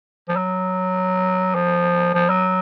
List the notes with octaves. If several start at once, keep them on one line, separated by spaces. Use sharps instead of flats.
F3
F#3
F3
F3
F#3